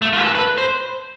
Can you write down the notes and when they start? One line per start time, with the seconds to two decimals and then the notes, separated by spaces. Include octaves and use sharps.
0.02 A3
0.13 F4
0.20 B4
0.24 A4
0.35 B4
0.58 C5